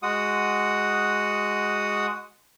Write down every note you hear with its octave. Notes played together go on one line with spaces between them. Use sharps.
G#3 F#4 F#5 D#6